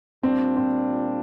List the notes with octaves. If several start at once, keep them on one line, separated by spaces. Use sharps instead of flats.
A#2 G3 C4 D4 F4
C4